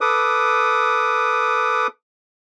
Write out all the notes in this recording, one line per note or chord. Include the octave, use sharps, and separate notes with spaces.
A4 B4 D6 D#6